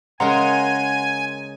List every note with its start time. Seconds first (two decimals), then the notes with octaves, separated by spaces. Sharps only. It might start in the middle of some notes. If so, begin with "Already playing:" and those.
0.20 C#3 G#3 A#4 F#5 G#5 A#5 C6